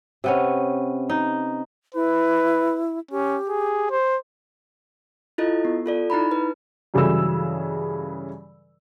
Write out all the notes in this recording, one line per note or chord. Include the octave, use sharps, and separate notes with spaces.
C3 B3 C#4
D#4
E4 B4
C#4 G4
G#4
C5
E4 F4 A4 D#5
B3
F4 A4 D5
D#4 E4 A#5 B5
B4
G2 C#3 E3 F#3 A4 E6